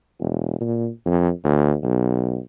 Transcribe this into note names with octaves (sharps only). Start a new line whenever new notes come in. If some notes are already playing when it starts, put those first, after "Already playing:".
E1
A#2
F2
D2
B1